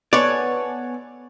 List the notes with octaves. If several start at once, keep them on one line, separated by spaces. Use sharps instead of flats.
B3 A4 C#5 D5 F#5 G#5